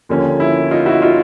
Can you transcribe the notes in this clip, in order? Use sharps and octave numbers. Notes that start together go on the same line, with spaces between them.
D#2 D3 F3 A#3 C#4
E4
D#4 F4
E4 F#4
D#4 F4